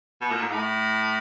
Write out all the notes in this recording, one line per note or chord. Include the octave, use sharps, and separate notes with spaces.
B2
A#2
G#2
A2